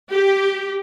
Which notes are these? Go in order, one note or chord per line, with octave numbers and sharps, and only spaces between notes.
G4